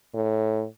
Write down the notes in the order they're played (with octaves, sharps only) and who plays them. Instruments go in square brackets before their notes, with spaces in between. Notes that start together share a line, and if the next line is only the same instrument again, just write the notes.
[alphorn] A2